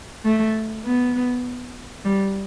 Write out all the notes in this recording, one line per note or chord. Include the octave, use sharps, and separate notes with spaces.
A3
B3
G3